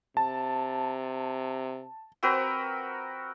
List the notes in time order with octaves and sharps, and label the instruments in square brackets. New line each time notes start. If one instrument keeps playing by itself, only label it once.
[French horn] C3 [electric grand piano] A5
[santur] C4 F#4 A#4 B4